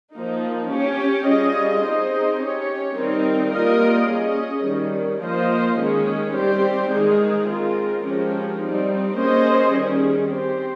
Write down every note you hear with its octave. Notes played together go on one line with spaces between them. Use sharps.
F3 A#3 D#4
C#4 G4 C#5
G3 C#4 F4 G#4 D#5
C4 D#4 G#4 C5 D#5
C#4 G4 C#5
D#3 G3 C4 D#4 A#4
G3 A#3 F4 A#4 D#5
C#4 G#4 D#5
D#3 G3 C#4
F3 A#3 F4 C5 D#5
D#3 G#3 C#4 G#4
G3 C4 G4 C5
D#3 G#3 D#4 G#4
G#3 C4 F4 A#4
F3 G#3 C#4 G4 A#4
G3 C4 D#4
A#3 C#4 G#4 C5 D#5
D#3 G3 C#4 G#4
C4 G4 C5